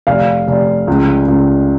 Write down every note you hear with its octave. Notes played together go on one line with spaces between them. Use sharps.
F1 F5
F1
C#2
C#2